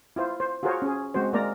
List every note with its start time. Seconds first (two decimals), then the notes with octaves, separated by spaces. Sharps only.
0.16 E4 F4 C5
0.40 C5
0.63 F4 F#4 G#4 A#4 C5 C#5
0.82 C#4 G#4
1.14 G#3 C4 F#4 C5
1.33 G#3 A#3 A#4 D5 A#5